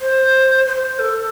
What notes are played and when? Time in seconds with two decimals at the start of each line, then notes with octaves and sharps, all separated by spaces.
0.01 C5
0.67 C5
0.99 A4